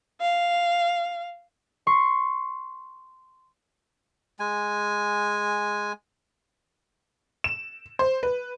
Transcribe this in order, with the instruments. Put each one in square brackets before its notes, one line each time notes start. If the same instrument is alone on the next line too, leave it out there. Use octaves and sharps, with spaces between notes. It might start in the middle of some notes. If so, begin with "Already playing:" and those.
[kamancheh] F5
[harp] C6 C#6
[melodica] G#3 G#5
[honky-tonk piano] E7
C5
B4